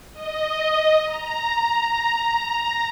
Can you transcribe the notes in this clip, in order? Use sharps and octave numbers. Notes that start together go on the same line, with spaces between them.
D#5
A#5